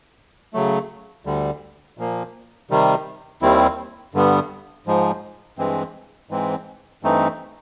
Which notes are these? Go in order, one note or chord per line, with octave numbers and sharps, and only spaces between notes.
C#3 F#3 A3
D2 D3 G3
A#2 F3 A#3
C3 D#3 G3
D#2 D#3 G3 C4 E4
G2 D3 G3 B3
G#2 F3 G#3
G2 E3 G#3 C4
G#2 E3 G#3 C4
G2 E3 A3 C4 D#4